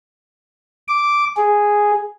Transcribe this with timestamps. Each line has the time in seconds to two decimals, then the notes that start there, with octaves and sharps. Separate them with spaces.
0.88 D6
1.37 G#4